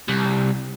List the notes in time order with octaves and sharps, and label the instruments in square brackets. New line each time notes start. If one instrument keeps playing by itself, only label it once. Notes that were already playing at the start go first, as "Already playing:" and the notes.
[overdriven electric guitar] C2